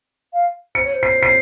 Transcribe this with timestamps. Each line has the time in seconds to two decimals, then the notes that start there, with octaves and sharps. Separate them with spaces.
0.33 F5
0.75 C5 C#7
0.84 C#5
0.93 C5
1.03 C7
1.23 C7